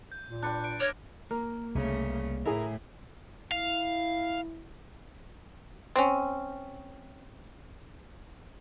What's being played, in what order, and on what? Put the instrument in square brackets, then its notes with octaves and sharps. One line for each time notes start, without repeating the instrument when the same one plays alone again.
[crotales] G6
[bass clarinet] A#2
[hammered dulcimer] D4 B4 G5 [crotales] F#6 C#7
[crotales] F#6 C#7 D7
[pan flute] C#5 [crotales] D6 F6 A#6
[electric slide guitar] A#3 [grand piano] A#4
[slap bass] C2 [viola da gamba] C#3 A3
[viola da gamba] A2 [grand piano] E4 G#4 [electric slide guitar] A#4
[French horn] E4 [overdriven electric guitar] F5
[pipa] C4 C#4